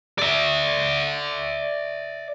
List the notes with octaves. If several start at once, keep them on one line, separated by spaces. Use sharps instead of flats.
D5 E5